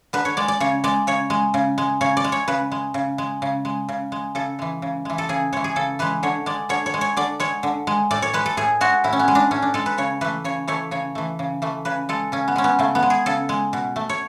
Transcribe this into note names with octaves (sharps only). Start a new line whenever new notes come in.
D3 B4
C#5
G#3 D5
D5
C#3 C#5
G#3 D5
C#3 C#5
G#3
C#3
G#3
C#3 C#5
D5
G#3
C#5
C#3 B4
G#3
C#3
G#3
C#3
G#3
C#3
G#3
C#3 A4
E3 G#3
C#3
E3 G#3
A4
C#3 G#4
E3 G#3 C#5
G#4
C#3 A4
E3 G#3 B4
D3 C#5
G#3 D5
D3 C#5
C#5
G#3
C#5
D3 D5
G#3 C#5
D3
G#3
A2 D5
C#5
G#3 B4
A4
A2 G#4
G#3 F#4
A2 E4
C#4
B3
G#3
D4
A2 C#4
D4
G#3 A4
B4
C#3 C#5
E3 A3 B4
C#3 C#5
E3 A3 C#5
C#3 C#5
E3 A3
C#3
E3 A3
C#3 B4
G#3 A4
C#3 C#4
B3
G#3 C#4
B3
C#3 A3
B3
G#3
G#4
C#3 A4
G#3
B2
A3
C#5